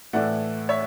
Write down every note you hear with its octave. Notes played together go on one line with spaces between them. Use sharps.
A2 E3 A3 D5 F#5
C#5 E5